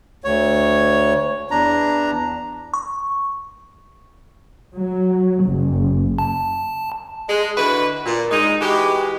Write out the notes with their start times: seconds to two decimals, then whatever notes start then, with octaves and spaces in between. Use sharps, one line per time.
0.24 D2 C#5
1.51 E2 D4 A#5
2.74 C#6
4.75 F#3
5.43 F#1
6.19 A5
7.29 G#3
7.57 D3 E3 F#4 B4
8.06 A#2
8.31 G#3 D#4
8.61 E3 G#3 F#4 G4